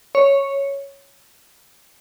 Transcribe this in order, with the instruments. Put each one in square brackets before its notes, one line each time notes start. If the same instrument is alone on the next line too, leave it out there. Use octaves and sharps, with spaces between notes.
[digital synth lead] C#5